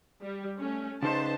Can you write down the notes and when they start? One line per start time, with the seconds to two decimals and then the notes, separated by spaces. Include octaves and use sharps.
0.22 G3
0.58 A3 C#4
1.03 C#3 D#4 B4 C5 A5